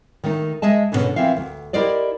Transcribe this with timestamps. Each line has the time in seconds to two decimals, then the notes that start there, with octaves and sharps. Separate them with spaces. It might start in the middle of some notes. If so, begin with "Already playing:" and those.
0.24 D#3 A3 D#4
0.62 G#3 D#5 E5 A5
0.92 G#2 B2 D3 A#3 B3 C#4
1.16 E3 F3 C4 E5 F5
1.37 D2
1.73 E4 G4 A#4 C5 D5 D#5